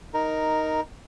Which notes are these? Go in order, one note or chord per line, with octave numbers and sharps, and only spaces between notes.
D#4 A#4